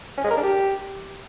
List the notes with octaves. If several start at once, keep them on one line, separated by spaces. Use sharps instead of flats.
C#4
G#3
A#4
D4
G4